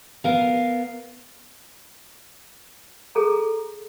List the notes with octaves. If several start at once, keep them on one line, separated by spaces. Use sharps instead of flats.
B3 A#4 F5
G#4 A4 A#5